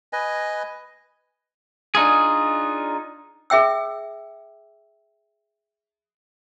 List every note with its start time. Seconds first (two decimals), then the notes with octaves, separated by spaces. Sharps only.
0.13 B4 D#5 G#5
1.95 D4 D#4 F4 G#4
3.50 G#4 E5 G5 E6